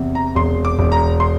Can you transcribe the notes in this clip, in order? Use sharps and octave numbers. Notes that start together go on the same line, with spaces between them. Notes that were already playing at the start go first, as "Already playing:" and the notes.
Already playing: E2 C3
A#5
E1 C6
D6
E1
A#5
C6